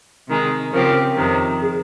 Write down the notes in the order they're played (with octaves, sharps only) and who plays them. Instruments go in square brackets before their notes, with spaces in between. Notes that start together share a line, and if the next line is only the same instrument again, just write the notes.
[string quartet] C3 D#3 G#3
[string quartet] C#3 F3 C4 G4 [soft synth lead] A#4
[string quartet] F2 C3 D#3
[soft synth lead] G#4